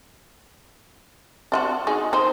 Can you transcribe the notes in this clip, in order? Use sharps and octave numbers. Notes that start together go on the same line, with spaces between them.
D4 F4 F#4
D#4 F#4 G#4
D#4 C5